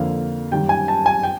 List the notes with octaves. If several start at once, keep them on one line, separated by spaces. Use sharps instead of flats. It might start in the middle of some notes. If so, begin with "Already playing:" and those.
Already playing: F2 D3 F3 A#3 F5
F#2 D#3 G3 G5
G#5
A5
G#5
G5